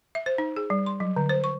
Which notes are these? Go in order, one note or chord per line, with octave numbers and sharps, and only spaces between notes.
E5
C5
D#4
G#4
G3
C6
F#3
D3
C5
C#6